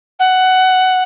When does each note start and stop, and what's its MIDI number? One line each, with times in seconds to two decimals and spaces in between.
0.19 1.03 78